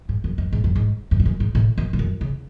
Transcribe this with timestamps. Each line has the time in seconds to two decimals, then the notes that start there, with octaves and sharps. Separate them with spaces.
0.09 G#2
0.24 F#2
0.38 F#2
0.52 G#2
0.64 F#2
0.76 G#2
1.11 F#2
1.20 G#2
1.25 F#2
1.40 G#2
1.55 A2
1.78 F#2
1.93 G#2
1.99 F#2
2.21 C#3